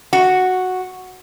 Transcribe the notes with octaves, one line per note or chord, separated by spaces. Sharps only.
F#4